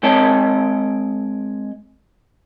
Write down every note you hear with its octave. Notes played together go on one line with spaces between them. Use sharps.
G#3 C4 C#5 D#5 G5 A5